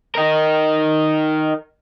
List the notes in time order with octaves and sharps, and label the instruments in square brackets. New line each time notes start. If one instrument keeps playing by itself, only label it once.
[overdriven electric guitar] D#4 A#4